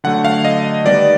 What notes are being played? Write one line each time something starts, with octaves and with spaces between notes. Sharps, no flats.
D3 F#3 A3 F#5
F5
D#5
D#3 G3 B3 D5